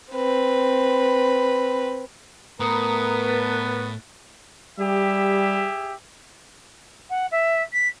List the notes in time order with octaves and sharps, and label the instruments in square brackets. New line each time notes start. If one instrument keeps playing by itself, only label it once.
[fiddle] C4 B4
[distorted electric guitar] A2 [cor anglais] B3 [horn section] A#4 B4 [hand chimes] A#5 D#6 C#7
[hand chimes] F#6 A6 B6
[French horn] G3 [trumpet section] G4 G#4 E5
[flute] F#5
E5
B6